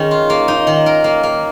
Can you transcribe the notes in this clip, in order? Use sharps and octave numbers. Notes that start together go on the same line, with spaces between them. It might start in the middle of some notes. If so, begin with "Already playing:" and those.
Already playing: D#3 G#3 C#4
F4
A#3
D#4
D#3
A#4
A#3
A#3